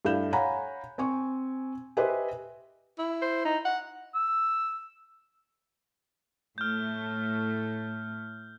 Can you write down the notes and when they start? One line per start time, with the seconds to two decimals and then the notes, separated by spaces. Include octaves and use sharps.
0.05 G2 A3 E4 F5 G6 E7
0.32 C#5 F5 F#5 G#5 A#5 B5
0.98 C4 G#5 C#6
1.97 G4 B4 C5 D#5 E5 G#5
2.98 E4
3.22 C5
3.45 D#4
3.65 F#5
4.15 E6
6.58 A2 A3 F6 G6